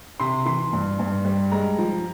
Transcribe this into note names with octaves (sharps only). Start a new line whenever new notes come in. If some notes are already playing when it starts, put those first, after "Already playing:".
C3 C6
E3 C6
G2
G2
G3
G#3 A#5
F3